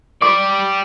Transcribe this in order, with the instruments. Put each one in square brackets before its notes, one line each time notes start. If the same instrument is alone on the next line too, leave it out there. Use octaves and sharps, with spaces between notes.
[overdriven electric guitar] G4 D5 [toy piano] D6